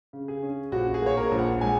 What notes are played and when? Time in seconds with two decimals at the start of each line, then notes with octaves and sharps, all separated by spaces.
0.13 C#3
0.28 G#4
0.43 C#4
0.72 A#1 F#4
0.94 G#4
1.02 A#3 C#5
1.17 A#4
1.31 A#1
1.38 F#5
1.61 G#3 G#5